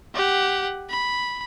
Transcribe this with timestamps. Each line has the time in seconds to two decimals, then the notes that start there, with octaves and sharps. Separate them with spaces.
0.14 G4 F#5
0.89 B5